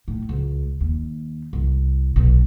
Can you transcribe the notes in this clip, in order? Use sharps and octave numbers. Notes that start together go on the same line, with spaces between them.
A2
C#2
D#2
C2
B1